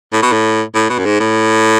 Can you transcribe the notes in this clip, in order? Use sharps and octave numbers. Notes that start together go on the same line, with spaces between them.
A2
B2
A2
A2
B2
F#2
G#2
A2